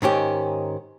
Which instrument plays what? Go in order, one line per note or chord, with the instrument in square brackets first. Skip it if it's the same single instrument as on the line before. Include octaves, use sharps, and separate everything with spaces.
[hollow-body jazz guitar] G#2 D#3 C#4 G4